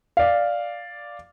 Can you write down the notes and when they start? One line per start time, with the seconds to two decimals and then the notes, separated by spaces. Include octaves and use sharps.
0.17 D5 F5